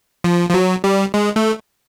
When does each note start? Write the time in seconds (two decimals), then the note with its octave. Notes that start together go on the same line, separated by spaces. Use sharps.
0.24 F3
0.49 F3
0.54 F#3
0.84 G3
1.14 G#3
1.36 A3